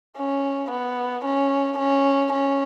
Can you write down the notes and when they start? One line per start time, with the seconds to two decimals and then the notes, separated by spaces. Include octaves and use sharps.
0.18 C#4
0.71 B3
1.25 C#4
1.78 C#4
2.33 C#4